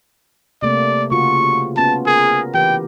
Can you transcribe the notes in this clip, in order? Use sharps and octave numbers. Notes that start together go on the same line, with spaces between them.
C3 A3 A#3 D5
C#3 F4 F#4 C#6
B3 C#4 F4 A5
G#4 A#4
E3 G4 B4 G5